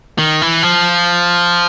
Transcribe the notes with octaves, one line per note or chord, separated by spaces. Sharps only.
D#3
E3
F3